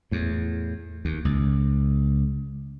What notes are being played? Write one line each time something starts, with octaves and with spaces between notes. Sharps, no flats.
E2 A2
D#2
C#2